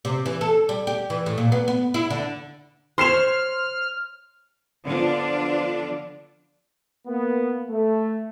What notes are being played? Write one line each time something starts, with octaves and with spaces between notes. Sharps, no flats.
C3
E3
A4
G3
G4
E3
A2
A#2
B3
B3
E4
D3
C5 C#5 C6 F6 C7 E7
D3 F3 B3 D4 F4 D5
A#3 B3
A3